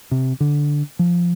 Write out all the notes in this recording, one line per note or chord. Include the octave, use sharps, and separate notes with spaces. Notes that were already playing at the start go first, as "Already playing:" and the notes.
C3
D3
F3